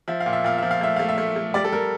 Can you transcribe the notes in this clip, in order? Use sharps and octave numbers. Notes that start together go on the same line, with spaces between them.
F3 E5
F5
A#2
E5
A#2 F5
F3 E5
F5
A3 E5
A3 F5
E5
A3
A3
G3 D5
A4
G3 A#4